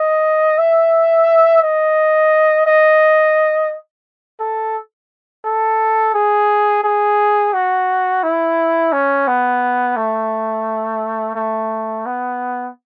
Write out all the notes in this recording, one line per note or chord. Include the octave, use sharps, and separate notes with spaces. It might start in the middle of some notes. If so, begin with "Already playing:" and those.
Already playing: D#5
E5
D#5
D#5
A4
A4
G#4
G#4
F#4
E4
C#4
B3
A3
A3
B3